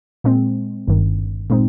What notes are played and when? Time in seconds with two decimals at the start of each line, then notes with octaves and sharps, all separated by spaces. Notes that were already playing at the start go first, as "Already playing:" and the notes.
0.24 A#2 G#3 C4
0.87 G1 G2 D#3
1.50 A#2 G#3 C4 D#4